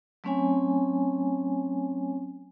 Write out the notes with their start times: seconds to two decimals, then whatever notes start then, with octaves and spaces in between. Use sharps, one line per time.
0.24 F#3 A3 C4 C#4 C#5 G#5